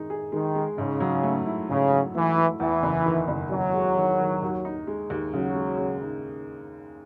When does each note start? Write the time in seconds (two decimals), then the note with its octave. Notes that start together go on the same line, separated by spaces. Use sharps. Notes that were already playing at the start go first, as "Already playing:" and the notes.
Already playing: D#3 G#3 D#4
0.10 G#4
0.32 D#3 G#3
0.55 G#3
0.78 G#2 C#3
1.00 F#3
1.23 A3
1.46 E4
1.69 G#2 C#3
1.92 F#3
2.15 E3 A3
2.37 E4
2.60 E2 E3
2.83 F#1
3.06 D#3
3.28 F#1
3.51 F#1 F#3
3.74 G#3
3.97 D#3
4.19 D#3
4.42 D#2
4.65 D#4
4.87 G#3
5.10 D#2
5.33 C#3 F#3
5.56 G#3
5.78 C#3
6.01 D#4